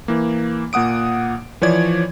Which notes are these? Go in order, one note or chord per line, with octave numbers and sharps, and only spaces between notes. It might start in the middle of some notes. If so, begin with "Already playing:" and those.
E3 A#3
A#2 A#3 F#5 D#6 D7
E3 F3 C#5 D5 G#6